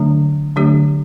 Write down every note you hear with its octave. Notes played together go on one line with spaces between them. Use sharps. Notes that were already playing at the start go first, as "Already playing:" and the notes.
Already playing: D3 F#3 A3 D4
D3 F#3 A3 D4 G4